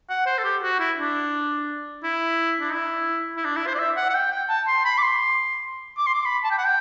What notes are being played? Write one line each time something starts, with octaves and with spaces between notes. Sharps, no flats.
F#5
C5
A4
G4
F#4
E4
D4
E4
D4
E4
E4
D4
E4
C5
D5
E5
F#5
F#5
G5
G5
A5
C6
B5
D6
C6
D6
C6
D6
B5
A5
G5
F#5
G5